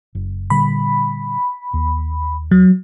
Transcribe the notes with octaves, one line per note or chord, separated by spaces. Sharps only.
F#1
A#2 D3 G3 B5
D#2
F#3